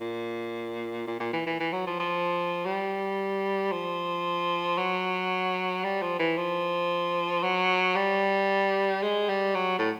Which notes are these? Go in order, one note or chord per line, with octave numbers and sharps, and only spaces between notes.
A#2
A#2
A#2
E3
E3
E3
F#3
F3
F3
G3
F3
F#3
G3
F3
E3
F3
F#3
G3
G#3
G3
F#3
A2